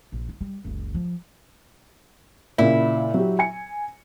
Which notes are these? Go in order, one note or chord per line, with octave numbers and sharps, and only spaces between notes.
A#1
E4
G3
F#1 C#2
F3
A#2 C#3 E4
F#3 G4
G#5 C#7